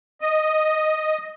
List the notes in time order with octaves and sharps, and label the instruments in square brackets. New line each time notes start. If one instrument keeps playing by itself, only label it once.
[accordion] D#5